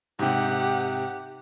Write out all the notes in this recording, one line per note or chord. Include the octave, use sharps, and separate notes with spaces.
G#2 C3 G4 F#5